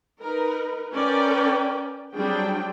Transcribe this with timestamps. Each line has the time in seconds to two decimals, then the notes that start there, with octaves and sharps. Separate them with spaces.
0.22 D#4 A#4 B4
0.91 C#4 A#4 B4 D5 G5
2.14 F#3 G3 C4 D4 G#4 G5